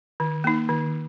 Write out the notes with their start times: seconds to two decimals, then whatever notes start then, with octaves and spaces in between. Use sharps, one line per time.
0.20 D#3
0.44 A#3 D#4
0.69 D#3